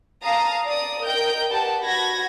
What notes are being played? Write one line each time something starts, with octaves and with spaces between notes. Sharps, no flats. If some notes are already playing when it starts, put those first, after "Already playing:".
F5 A5 A#5 D#6 A#6
D5 D#6
A#4 D#5 G5 G6
G4 B4 D5 F#5 A5
F#4 F#5 B5 G#6 A#6